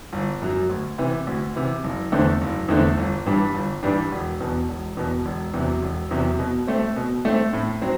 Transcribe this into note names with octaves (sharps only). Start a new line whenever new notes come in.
G1
F#2 F#3
D2
C3 E3
D2
C3 E3
F#1
E2 D3 A3 C4
F#1
E2 D3 A3 C4
G1
G2 E3 G3 D4
G1
G2 E3 G3 D4
E1
E2 B2
E1
E2 B2
E1
E2 C3 F#3
E1
E2 C3 F#3
B2
A3 C4
B2
A3 C4
A2
F#3 C4